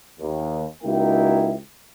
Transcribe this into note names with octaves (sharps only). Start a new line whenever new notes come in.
D#2
C#2 A#3 D#4 E4 F#4 G5